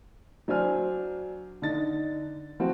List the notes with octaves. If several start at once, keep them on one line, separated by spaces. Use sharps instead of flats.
F#3 D4 C5 G#5 F6
D3 D#4 A6
F3 C4 F#4